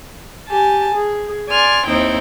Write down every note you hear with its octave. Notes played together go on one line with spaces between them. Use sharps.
G4 G#5 A5
G#4
D5 G#5 C6 F6 G#6
D#2 C4 D#4 E4 G5